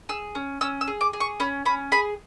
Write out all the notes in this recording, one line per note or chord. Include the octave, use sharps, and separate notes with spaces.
G#4 E6
C#4
C#4 E6
E6
G#4
D6
G#4
C#6
C#4 B5
C#4 B5
G#4 B5